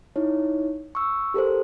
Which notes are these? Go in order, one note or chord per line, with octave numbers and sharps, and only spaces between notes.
D#4 E4 C#5
C#6 E6
G4 A4 A#4 C5